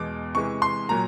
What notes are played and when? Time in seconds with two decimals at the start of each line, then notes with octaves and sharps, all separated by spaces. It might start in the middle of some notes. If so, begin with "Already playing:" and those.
Already playing: E2 B2 G#3 D6
0.35 C3 E3 G#3 C#6
0.62 C6
0.89 A#2 F#3 A#5